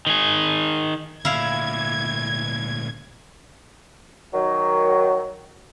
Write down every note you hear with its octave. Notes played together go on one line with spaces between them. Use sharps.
D#3 G#4
D2 A#2 E4 F5 G#6
D#3 F#3